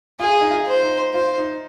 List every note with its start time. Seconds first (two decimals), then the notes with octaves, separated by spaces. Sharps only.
0.20 F4 G#4
0.41 D#4
0.51 F4
0.67 C5
0.83 D#4
1.14 F4 C5
1.38 D#4